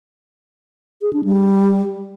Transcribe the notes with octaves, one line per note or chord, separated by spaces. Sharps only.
G#4
D4
G3